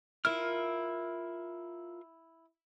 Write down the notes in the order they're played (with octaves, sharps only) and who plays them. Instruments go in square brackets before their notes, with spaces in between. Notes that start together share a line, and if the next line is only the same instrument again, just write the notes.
[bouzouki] E4 [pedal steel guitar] F4 A#4 F6